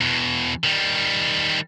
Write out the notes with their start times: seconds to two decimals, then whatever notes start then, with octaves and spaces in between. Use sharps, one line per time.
0.01 E2 B2
0.64 D#3 G3